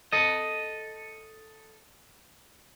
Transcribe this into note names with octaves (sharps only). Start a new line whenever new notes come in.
A4 D#5